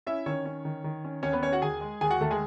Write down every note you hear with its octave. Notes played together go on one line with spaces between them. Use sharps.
C#4 E4 E5
D#3 C#4 C#5
C#4
D#3
D#3
C#4
D#2 C#4 C#5
B3 B4
C#4 C#5
F#4 F#5
D#2 G#4 G#5
G#3
D#2 G#4 G#5
F#4 F#5
D#2 A3 A4
G#3 G#4